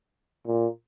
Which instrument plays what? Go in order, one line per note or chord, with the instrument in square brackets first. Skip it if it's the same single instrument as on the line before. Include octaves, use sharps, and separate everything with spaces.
[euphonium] A#2